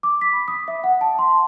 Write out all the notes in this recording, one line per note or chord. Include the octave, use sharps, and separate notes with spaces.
D6
B6
B5
D#6
E5
F#5
A5
C6